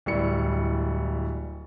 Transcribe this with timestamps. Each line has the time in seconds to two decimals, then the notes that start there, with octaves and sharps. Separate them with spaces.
0.06 D1 G3 E4 C#7